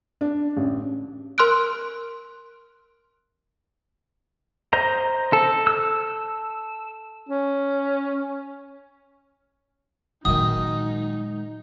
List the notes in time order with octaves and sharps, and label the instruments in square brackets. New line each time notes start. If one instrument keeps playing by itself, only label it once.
[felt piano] D4
A1
[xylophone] A#4 C6 F6 F#6 D7
[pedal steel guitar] C5 D#5 A#5
[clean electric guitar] A4
[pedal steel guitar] E6
[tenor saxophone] C#4
[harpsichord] F#2 D#3 [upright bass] A#2 G#3 [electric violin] D#4 [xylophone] D#6